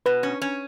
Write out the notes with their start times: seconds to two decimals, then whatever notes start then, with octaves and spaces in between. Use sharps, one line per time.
0.06 B2 B4
0.23 C#4
0.42 C#4